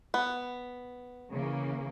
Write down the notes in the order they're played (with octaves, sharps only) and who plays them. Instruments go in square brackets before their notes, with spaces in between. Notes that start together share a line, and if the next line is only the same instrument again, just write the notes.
[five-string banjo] B3
[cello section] C#3 E3 A#3